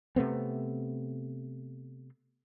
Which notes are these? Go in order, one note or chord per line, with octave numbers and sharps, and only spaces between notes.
C3 A3 B3 C4